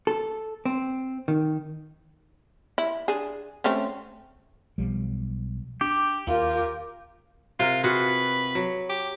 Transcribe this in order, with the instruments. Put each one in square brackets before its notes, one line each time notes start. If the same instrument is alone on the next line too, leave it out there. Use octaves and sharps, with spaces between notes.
[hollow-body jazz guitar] A4
C4
D#3
[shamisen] E4
D4 G#4
A3 C4 C#4
[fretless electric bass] B1 F3 G3
[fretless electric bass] D4 [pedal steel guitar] G4
[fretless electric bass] D#2 [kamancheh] F4 A#4
[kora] C3 A#4 [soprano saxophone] F4
[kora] F4 F#4 G#4 [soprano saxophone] B4
[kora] F#3
[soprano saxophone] G4